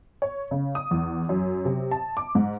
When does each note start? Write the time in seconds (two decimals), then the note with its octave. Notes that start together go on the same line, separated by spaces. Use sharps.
0.22 C#5
0.51 C#3
0.75 D#6
0.91 E2
1.29 F#2
1.65 C3
1.91 A5
2.17 D6
2.35 G#2